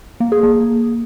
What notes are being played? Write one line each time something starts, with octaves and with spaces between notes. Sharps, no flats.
A#3
G#4
A#3